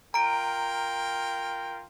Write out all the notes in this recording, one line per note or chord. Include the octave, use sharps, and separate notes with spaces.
F4 A#4 G5 A#5 D7